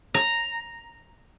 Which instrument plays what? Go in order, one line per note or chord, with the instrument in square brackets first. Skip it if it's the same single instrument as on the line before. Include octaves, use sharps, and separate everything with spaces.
[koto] A#5